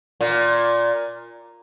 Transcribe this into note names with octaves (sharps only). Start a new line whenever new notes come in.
A#2